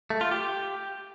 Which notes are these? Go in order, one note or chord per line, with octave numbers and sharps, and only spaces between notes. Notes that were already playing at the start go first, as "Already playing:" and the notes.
A3
F4
G4